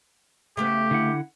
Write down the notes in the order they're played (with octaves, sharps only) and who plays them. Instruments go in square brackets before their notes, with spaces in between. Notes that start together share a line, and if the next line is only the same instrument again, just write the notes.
[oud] C#3 A3 B3 [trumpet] G4
[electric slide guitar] D3 E4 F#5